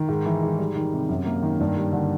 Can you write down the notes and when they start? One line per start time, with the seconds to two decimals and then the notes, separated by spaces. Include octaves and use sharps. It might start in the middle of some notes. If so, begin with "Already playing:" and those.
Already playing: D#3
0.08 G#2
0.25 E3
0.43 G#2
0.58 G3
0.76 D#3
0.93 C3
1.09 F#2
1.26 A#3
1.43 D#3
1.60 G2
1.77 G3
1.93 D3